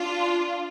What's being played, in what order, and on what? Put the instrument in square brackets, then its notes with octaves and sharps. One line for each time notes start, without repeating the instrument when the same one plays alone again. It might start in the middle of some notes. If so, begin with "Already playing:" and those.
Already playing: [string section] D4 F4